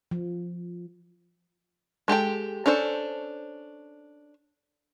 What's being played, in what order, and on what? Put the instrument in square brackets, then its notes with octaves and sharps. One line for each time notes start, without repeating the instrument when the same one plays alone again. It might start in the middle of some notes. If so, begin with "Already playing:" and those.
[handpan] F3
[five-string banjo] G#3 G4 A4 G5
C#4 D4 A4 C5